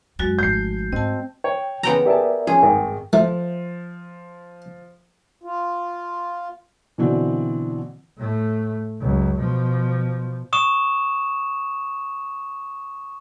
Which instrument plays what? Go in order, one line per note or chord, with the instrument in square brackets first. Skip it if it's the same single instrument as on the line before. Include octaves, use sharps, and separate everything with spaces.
[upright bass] F#2 [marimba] G#3 F#4 A6
[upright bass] G#1 F3 [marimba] A3 [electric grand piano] G6 C7
[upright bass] G#2 [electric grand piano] C4 [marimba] D#5 A5
[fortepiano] C#5 [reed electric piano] G5
[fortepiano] C#3 C#4 [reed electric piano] E3 [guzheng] B3 G5 A#5
[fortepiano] G4 G#4 A5 [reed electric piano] A#4 D5 E5
[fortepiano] F3 [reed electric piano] C#4 C#5 [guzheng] G#4
[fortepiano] G#1 D#3 [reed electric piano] G2
[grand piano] F3 [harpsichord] A3
[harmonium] F4
[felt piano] B2 D3 E3 C4
[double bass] A2 A3
C#2 F#2
B2 F3
[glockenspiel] C#6 D#6 E7